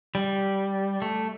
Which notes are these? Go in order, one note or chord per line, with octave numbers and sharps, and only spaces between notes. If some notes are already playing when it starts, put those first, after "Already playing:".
G3
A3